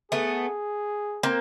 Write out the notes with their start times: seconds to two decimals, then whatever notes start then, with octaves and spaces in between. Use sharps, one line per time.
0.12 A3 B3 G#4
1.23 A#3 C4